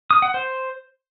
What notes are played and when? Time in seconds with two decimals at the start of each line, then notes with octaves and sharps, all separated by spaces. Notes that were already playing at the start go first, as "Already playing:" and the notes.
0.11 D#6
0.22 F#5
0.34 C5